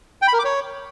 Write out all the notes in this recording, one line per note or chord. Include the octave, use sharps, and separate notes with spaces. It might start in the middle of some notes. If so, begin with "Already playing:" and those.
G5
B5
A#4
D6
C#5